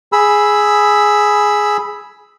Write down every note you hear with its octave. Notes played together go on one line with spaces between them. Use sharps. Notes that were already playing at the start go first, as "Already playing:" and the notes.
G#4 B5 E6